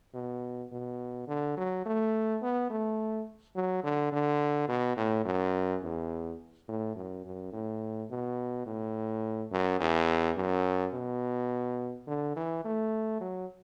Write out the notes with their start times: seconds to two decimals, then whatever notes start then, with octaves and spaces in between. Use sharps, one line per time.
0.14 B2
0.72 B2
1.28 D3
1.57 F#3
1.86 A3
2.42 B3
2.71 A3
3.56 F#3
3.84 D3
4.13 D3
4.68 B2
4.97 A2
5.25 F#2
5.83 E2
6.68 A2
6.96 F#2
7.25 F#2
7.53 A2
8.10 B2
8.66 A2
9.52 F#2
9.80 E2
10.37 F#2
10.93 B2
12.07 D3
12.36 E3
12.65 A3
13.20 F#3